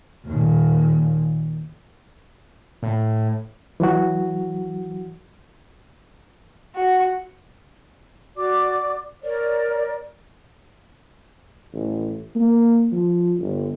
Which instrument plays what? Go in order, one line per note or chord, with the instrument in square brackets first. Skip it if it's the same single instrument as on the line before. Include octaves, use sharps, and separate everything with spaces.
[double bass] D#2 A#2
[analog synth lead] A2
[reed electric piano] E3 F#3 F#4
[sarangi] F#4
[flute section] F#4 D5 D6
A#4 C#5 D5
[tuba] A1
A#3
F3
G1